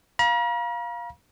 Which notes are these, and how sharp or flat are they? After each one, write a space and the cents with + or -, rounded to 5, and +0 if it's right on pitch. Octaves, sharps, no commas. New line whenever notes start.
F5 +0 A#5 +45